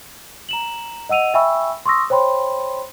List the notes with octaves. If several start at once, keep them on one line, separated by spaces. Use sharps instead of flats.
A#5 E7 F#7
D#5 F#5 E6 D#7 F7
E5 G5 G#5 B5 C#6 E6
C6 C#6 D#6 E6 A#6
C5 C#5 G5 B5 C6